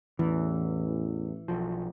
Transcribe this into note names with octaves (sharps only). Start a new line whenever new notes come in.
A1 E2 E3
B1 F3